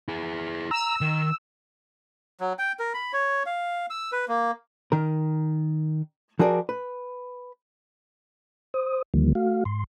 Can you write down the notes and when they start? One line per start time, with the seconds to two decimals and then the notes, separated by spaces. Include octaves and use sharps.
0.09 E4 G#4
0.71 A#5 E6
1.01 D#3
2.40 F#3
2.59 G5
2.79 A#4
2.94 B5
3.13 C#5
3.46 F5
3.90 E6
4.12 B4
4.28 A#3
4.92 D#3 A#4
6.39 F3 F#4 G#4 A#4 D5
6.69 B4
8.74 C5 D#6
9.14 D2 D3 D#3 F3 G3 A#3
9.35 A3 F#4 F5
9.65 G#2 C6